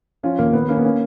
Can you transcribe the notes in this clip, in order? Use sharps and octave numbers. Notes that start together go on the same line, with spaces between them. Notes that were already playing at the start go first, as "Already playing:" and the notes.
F3 C#4 F4
D#2 A#3
D#2 B3
A#3 C#4
B3
A#3 C#4